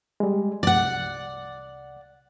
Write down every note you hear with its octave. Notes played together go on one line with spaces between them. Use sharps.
G3 G#3
C2 D5 F#5